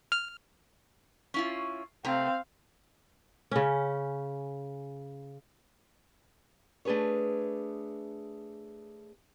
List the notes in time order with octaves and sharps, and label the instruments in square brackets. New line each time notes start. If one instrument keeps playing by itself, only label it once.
[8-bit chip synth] F6
[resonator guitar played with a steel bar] C#4 E4 F4
[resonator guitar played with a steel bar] C3 A3 A#5 [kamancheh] C4 F5
[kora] C#3 C#4
[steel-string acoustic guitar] A3 D4 G#4 B4 C#5